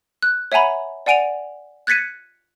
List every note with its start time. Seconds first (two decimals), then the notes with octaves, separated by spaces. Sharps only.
0.22 F#6
0.52 C#5 E5 F#5 G#5 A#5 B5
1.06 D5 F#5 G#5 D7 D#7 F7
1.87 F#6 G#6 A6 B6 C#7 D#7